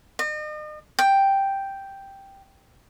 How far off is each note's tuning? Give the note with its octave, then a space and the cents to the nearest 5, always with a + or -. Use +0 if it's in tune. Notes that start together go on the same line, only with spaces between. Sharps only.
D#5 -40
G5 +0